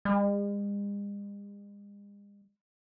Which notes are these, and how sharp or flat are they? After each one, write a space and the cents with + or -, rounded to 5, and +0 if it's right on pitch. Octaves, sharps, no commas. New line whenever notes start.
G#3 -45